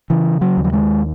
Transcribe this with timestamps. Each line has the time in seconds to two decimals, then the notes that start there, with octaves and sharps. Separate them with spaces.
0.10 C#3 E3
0.41 F#3
0.57 D#2
0.64 F#3
0.73 G#3